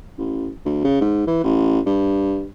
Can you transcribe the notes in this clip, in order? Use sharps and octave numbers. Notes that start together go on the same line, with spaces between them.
A1
D2
C#3
G#2
E3
A1
G2